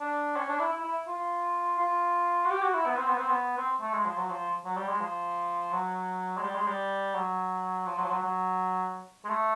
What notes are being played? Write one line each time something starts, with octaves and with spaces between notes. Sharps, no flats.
D4
C#4
D4
E4
E4
E4
F4
F4
F#4
G4
F#4
E4
B3
C4
B3
C4
B3
C4
A3
G#3
F3
F#3
F3
F#3
G3
G#3
F3
F#3
G#3
G3
G#3
G3
F#3
F3
F#3
F3
F#3
F#3
G#3
A3